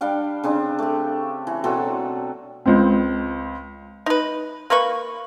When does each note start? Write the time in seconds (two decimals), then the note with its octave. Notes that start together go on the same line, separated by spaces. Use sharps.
0.01 G3 D4 F5 G5
0.44 C#3 C4 D4
0.79 A3 G4
1.47 E3
1.64 B2 F#3 C4 A4
2.66 C#2 C4
4.06 D#4 B4
4.70 A#3 B4 B5 C#6